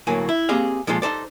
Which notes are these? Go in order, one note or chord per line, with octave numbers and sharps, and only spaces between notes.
D2 A2 F#3 A#3 G#5
E4
A#3 C4 G4 G#4 D#5 F5
A#2 F3 G#3 F4 A4
D#4 A4 C5 D5